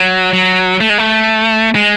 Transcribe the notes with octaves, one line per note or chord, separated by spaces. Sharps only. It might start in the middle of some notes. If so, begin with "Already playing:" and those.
Already playing: F#3
F#3
A3
G#3
A3
G#3